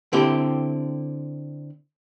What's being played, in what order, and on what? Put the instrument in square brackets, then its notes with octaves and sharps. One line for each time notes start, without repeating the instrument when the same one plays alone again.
[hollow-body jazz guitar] D3 C4 E4 G4